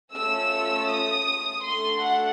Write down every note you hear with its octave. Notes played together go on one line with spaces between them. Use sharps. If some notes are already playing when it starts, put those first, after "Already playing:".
A3 C#4 F4 E6
D#6
A3 D4 F#4 A4 C6
F#5